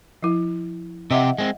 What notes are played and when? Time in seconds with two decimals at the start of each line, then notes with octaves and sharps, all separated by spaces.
0.23 F3 E4
1.11 C3 C4 G4 D#5 E5 F#5
1.38 G#3 C4